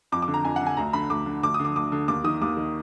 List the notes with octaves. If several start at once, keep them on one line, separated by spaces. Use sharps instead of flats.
F2 D6
D6
D3
A#5
F2 G#5
D3 F#5
G#5
D2 A#5
D3 B5
D2 D6
D3
D2 D6
D#6
D3
D6
D2 D6
D3
D#2 D6
D#3 D#6
D#2 D6
D#3